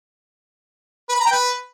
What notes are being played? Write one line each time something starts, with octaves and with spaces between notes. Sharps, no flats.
B4
B5
A#5
G5
B4